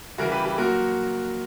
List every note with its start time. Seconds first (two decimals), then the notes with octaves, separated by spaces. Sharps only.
0.18 C#3 E3 G3 F#4 A#4
0.31 G4 B4
0.45 G4 B4
0.58 A#2 F#3 F#4 A#4